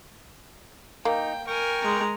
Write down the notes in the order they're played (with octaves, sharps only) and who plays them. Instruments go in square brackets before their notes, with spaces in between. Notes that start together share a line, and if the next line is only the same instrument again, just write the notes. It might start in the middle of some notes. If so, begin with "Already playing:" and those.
[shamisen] A#3 [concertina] D#4 [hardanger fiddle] G5
[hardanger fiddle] A#4 G#5 [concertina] G5 C#6
[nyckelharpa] G#3 A#5